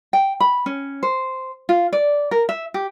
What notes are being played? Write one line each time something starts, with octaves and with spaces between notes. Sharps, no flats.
G5
B5
C#4
C5
F4
D5
A#4
E5
G4